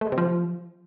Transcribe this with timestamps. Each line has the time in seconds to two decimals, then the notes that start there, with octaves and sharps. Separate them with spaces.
0.01 A3
0.07 G#3
0.12 C3
0.18 F3